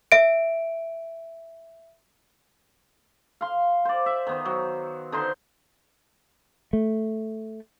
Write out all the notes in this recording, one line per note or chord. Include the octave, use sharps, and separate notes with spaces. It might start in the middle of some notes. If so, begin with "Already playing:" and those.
E5 D7
F5 C6
C5 D5
E5
D#3 B3 C5
F#3
D3 D#4 C5 C6
A3